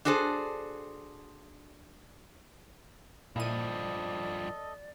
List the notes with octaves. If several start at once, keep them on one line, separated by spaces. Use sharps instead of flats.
D4 F#4 G#4 A4 C5
G2 A#2 F3 E4 A4 D5 D#5 D#7